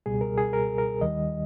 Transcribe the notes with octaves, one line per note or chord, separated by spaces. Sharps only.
C#2 B2 G3 G#4
A#4
G#4
A#4
A#4
D#2 D#3 G3 D#5